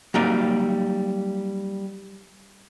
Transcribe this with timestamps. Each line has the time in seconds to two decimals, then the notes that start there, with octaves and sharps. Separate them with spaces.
0.14 F#3 G3 A#3 D#4 D5